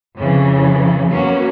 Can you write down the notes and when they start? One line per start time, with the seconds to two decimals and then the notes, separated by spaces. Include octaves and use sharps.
0.17 F2 C#3 E3
1.10 F#3 A#3 B3 C#4 F#4